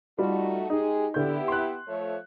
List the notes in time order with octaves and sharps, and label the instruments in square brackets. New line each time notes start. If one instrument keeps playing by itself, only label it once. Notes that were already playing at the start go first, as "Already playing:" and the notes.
[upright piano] G3 F4 [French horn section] A3 D#4 F#4
[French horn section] G#3 G4 G#4 [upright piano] D#4
[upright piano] D3 G6 [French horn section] B3 E4 G4
[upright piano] C6 F#6
[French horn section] F3 A3 C#5